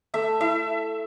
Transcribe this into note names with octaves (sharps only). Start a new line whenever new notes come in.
A3 E5
E4 E5